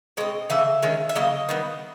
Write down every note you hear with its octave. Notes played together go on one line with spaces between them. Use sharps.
B2 G#3 C4 D#5
C#3 E3 A3 E5
D#3 G#3 C#4
E5
C#3 F#3 A#3 D#5
D#3 G3 B3